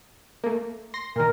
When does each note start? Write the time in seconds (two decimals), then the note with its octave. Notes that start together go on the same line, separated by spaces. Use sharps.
0.44 A3 A#3
0.94 C6 A#6
1.16 A#2 D#3 A#4